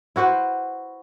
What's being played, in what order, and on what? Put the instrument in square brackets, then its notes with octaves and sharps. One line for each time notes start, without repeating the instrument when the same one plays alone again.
[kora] E4 F#4 B4 C5